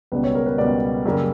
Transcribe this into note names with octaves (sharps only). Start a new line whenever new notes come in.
C#2 B2 G3 B4
C#5
A#4
B4
C#2 B2 G3 D5
F#2 C#3 G3 A#3